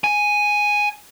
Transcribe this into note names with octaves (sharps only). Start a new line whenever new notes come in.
G#5